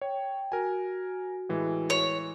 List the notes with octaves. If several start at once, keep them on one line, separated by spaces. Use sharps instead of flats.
C#5 G5
F#4 A#4 G#5
A2 E3 G#3
C#5